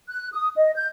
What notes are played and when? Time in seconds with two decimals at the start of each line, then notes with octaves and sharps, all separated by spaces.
0.09 F#6
0.34 D#6
0.56 D#5
0.75 G6